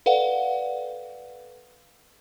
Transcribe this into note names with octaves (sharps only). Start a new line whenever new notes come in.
A4 B4 D5 F5 F#5